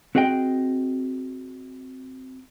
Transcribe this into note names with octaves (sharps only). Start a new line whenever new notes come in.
C4 F#4 G#4 D#5 G5